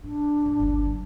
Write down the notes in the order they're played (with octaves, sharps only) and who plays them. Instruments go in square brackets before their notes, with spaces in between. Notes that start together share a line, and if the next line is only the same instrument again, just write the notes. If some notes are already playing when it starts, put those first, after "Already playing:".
[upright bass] A2 [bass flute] D4
[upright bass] E2 G#2
G1 C#2
F#3